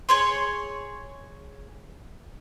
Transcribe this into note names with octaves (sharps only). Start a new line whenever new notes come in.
G#4 C#5 C6